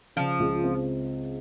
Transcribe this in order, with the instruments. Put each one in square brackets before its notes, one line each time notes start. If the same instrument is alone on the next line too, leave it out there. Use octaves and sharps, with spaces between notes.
[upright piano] C#3 [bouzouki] F3
[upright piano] C#2
C4